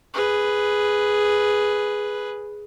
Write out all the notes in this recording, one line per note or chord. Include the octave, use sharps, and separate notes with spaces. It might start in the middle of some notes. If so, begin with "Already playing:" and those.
G#4 B4